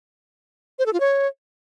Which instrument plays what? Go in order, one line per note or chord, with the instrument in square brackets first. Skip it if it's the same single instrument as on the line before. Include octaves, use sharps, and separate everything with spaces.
[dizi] C5
A4
F4
C#5